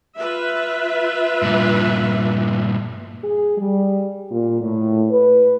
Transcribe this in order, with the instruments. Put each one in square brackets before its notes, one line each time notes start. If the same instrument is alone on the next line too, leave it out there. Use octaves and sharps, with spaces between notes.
[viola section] F4 B4 E5
[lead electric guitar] G2 A#2
[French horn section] G#4
G3
A#2
A2
B4